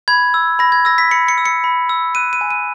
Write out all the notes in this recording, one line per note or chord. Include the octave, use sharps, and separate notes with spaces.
B5 G#6
E6
B5 A#6
G#6
E6 A#6
B6
B5 C#7
C#7
E6
C#7
B5
E6
F#6 D#7
D#7
G#5
D#7